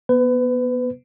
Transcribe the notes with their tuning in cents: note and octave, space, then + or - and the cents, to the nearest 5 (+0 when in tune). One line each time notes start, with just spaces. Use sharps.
B3 -20 B4 +30